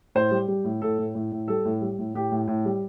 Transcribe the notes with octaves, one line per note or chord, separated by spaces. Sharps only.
A2 C5
G3
G3
A2
A2 A4
A2
A2
A2
G3 A4
A2
G3
A2
A2 G4
A2
A2
G3